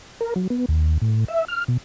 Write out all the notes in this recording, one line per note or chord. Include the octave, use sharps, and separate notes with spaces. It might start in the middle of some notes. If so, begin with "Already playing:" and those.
A#4
F#3
B3
D#2
A2
E5
F6
B2